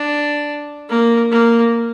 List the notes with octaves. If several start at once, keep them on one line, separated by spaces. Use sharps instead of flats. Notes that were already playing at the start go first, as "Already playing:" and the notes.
Already playing: D4
A#3
A#3